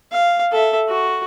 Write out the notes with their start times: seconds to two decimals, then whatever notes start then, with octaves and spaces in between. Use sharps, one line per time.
0.12 F5
0.52 A4 E5
0.88 F#4